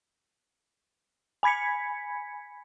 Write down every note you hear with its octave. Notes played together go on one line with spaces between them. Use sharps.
G#5 B5 G#6 B6 C#7